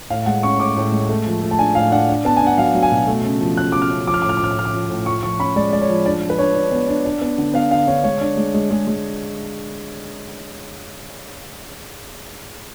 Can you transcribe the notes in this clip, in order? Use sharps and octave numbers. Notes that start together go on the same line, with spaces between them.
A2 F5
G#3 F#5
C#4 C#6
A2 D6
A2
G#3
A3
F3
A3
A5
D4 G#5
A2 F5
D4 F#5
D4
B3 A5
G#5
D4
F#5
F#3 F5
F#3
G#5
B2
A3
C#3
F3
C#3 F#6
C#3 D6
F6
C#4
F3 D6
F6
A2 D6
F6
D6
A2 F6
D6
F3 F6
D6
F3
A2
F3 C#6
F3 C#6
C#4 B5
G#3 D5
G#3 D5
C#5
F3
D4 D5
F3
B4
D4 C#5
D4
B3
D4
D4
B3
D3
B3 F5
D3 F5
D3 C#5
G#3 C#5
D4
G#3
G#3
G#3
G#3